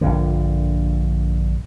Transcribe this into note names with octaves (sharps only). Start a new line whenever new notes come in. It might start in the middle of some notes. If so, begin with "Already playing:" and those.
A#1 G2 D3